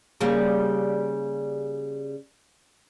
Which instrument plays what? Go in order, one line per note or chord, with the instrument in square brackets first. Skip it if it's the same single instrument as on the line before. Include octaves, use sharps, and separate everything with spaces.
[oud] C#3 G3 A#3